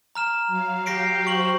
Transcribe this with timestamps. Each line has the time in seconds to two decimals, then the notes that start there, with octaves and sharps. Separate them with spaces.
0.15 A#5 F6 E7
0.47 F#3 F5
0.86 G4 A#6 C7 D7
1.27 F#4 C5 C#6 F#7